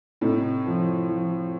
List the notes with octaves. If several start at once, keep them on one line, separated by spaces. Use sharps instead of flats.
A2 C3 D#4
F3
F3